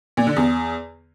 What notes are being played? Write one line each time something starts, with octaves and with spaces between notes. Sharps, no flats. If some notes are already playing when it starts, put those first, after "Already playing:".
A#2
D3
E2